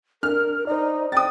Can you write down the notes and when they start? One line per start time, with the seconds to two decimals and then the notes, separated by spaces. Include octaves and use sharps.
0.23 D4 A#4 F6
0.67 D#4 C5 D5
1.12 G5 D#6 A6